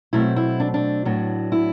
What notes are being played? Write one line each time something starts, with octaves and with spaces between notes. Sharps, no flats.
B2 F#3 A3 C4 E4
E4
D4
D4
A2 F#3 B3 D4
E4